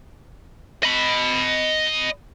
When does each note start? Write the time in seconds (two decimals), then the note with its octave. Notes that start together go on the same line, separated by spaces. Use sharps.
0.84 D#5 B5